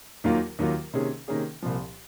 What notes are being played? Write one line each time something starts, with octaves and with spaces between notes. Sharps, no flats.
D#2 D#3 F#3 A#3 F4
D#2 D#3 F#3 A#3 F4
C3 D#3 A#3 C#4 G#4
C3 D#3 A#3 C#4 G#4
C2 A#2 F3